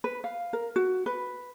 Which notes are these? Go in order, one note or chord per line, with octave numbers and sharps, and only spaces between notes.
B4
F5
A#4
F#4
B4